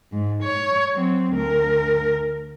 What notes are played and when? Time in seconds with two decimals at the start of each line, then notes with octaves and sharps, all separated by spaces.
0.12 G#2
0.43 C#5
0.94 F#3 C4
1.33 D2 A#4